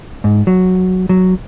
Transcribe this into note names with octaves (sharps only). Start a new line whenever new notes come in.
G#2
F#3
F#3